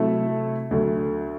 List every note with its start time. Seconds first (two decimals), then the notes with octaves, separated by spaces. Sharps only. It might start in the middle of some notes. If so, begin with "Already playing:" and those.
Already playing: C3 F#3 A3 E4 A4
0.71 D2 D3 F#3